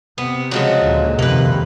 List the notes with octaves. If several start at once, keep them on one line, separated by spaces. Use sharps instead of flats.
C3 B3
C#3 F3 F#3 G#3 F#4
D2 A#2
F2 C3 D#3 A#3 B4